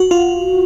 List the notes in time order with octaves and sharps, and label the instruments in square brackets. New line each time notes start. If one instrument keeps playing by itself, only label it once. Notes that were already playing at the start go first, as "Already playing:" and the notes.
Already playing: [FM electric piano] F#4
F4